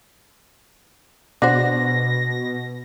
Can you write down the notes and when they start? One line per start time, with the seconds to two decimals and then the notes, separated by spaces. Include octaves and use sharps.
1.42 B2 D4 F#4 C5 A#6